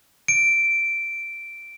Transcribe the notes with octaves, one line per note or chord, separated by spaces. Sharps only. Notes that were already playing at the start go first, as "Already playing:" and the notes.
D7